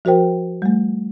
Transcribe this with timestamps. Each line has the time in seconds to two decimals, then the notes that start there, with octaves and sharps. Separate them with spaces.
0.05 F3 F#4 A#4 C5 G5
0.62 G3 A3